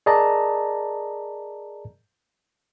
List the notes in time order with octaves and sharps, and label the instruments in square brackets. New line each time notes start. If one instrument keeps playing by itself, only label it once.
[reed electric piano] G#4 A#4 D5 D#5 A5 A#5